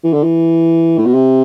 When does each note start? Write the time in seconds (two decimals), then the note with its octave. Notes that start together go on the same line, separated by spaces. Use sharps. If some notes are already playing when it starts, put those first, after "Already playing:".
0.04 E3
0.13 D3
0.23 E3
0.98 A2
1.06 B2
1.14 C3